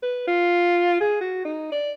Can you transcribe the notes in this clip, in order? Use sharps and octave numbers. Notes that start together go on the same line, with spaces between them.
B4
F4
G#4
F#4
D#4
D5